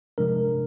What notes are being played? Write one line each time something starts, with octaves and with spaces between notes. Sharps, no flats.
C3 F3 G#3 D4 A#4